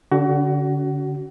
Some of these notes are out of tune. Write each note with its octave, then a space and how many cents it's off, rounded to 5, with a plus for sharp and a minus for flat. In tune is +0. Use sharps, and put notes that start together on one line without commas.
D3 -25 C#4 +35 F#4 +30